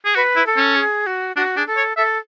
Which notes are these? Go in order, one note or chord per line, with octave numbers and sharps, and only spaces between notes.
G#4
F#4 B4
E4
A4
C#4
G#4
F#4
D4 F#4
D4 G#4
A4
C#5
A4 E5